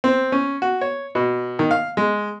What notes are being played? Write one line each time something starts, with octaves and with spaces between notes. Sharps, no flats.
C4
C#4
F#4
C#5
B2
D#3
F5
G#3